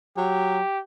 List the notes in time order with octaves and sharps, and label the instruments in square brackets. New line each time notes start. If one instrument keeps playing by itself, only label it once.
[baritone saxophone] F#3 [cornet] G4